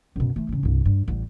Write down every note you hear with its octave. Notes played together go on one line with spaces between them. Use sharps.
F#2 B2
E3 A3
A1 C#3
C2 G2
G2
A1 G3